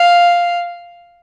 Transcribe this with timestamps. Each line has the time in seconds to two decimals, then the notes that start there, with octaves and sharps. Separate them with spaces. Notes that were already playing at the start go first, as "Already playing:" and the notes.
Already playing: F5